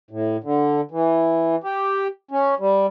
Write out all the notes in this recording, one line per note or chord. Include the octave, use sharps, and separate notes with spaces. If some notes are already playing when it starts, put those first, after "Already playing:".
A2
D3
E3
G4
C#4
G3